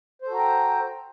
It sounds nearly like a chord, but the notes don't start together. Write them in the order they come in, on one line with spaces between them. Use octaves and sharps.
C5 A4 F#4 A#5 G5